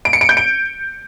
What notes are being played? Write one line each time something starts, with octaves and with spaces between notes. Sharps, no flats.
D7
C#7
D7
G6
D7